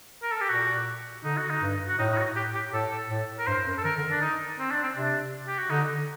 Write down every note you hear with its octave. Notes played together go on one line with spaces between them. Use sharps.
A#4
A4
G4
A#2 F#4
D3 D#4
F#4
D#4
G2
F#4
A2 D#4
D#4
F#4
G4
G4
A2 A4
A2
A#4
G2 C5
F#2
A4
D#3 A#4
D3
D#3
D4
D#4
C4
D4
C4
C3 D4
G4
F#4
D3 D#4